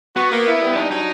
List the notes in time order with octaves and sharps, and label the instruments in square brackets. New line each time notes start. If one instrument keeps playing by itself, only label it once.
[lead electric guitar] B3 [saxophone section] F#4
[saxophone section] A#3
E4
G3
[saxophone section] D4 [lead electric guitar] D#4
[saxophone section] F#3 [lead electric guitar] D#4